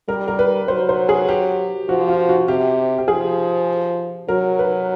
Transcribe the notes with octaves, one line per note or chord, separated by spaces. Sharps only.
G3 A#4
A#4
B4
F#3 C5
C5
G#4
G4
F3 F#4
F4
F#4
C3 G4
G4
F3 G#4
F#3 A#4
B4